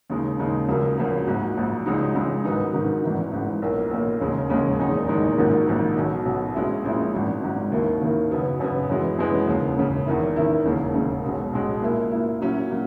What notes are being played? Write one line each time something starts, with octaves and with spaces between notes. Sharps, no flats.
D#2 C#3 G#3 D#4
D#2 C#3 G#3 D#4
C#2 C#3 F#3 A#3
C#2 C#3 F#3 A#3
A#1 G#2 F#3
A#1 G#2 F#3
C#2 C#3 G#3 D#4
C#2 C#3 G#3 D#4
G#2 D#3 F#3 B3 D#4
G#2 D#3 F#3 B3 D#4
G#1 G#2 E3
G#1 G#2 E3
B1 A#2 A#3
B1 A#2 A#3
E1 D#2 C#3 G#3 C#4
E1 D#2 C#3 G#3 C#4
F#1 E2 D#3 G#3 D#4
F#1 E2 D#3 G#3 D#4
A#1 G#2 D#3 F#3 A#3
A#1 G#2 D#3 F#3 A#3
B1 B2 F#3
B1 B2 F#3
A#1 A#2 G#3 C#4 E4
A#1 A#2 G#3 C#4 E4
G#1 G#2 F#3
G#1 G#2 F#3
D#2 D#3 A#3 E4
D#2 D#3 A#3 E4
F#2 C#3 F#3 B3
F#2 C#3 F#3 B3
F#2 E3 G#3 B3
F#2 E3 G#3 B3
E1 D#2 C#3
E1 D#2 C#3
E2 D#3 A#3 E4
E2 D#3 A#3 E4
E1 D#2 C#3
E1 D#2 C#3
B1 B2 G#3
B1 B2 G#3
A#2 A#3 E4
A#2 A#3 E4
A#2 F#3 C#4 E4
A#2 F#3